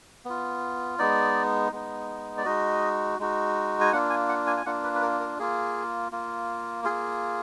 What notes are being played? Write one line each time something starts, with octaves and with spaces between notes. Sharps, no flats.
B3 F4
G#3 B3 D#4 D5
G#3 B3 D#4
D5
G#3 D#4 F#4 D#5
G#3 D#4 F#4
G#5
A#3 D4 F4 F#5
G#5
F#5
G#5
G#5
A#3 D4 F4 F#5
B4
B4
A#4
A#4
A#3 F4 G#4
A#3 F4
A#3 F4 G#4